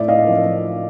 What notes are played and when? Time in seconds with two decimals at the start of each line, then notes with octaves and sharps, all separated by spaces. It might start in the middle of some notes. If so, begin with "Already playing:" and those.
Already playing: A2 D5 E5
0.08 D#5 F5
0.24 F3 A#3